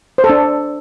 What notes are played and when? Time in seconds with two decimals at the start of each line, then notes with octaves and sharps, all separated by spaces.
0.18 C5
0.24 A4
0.29 D4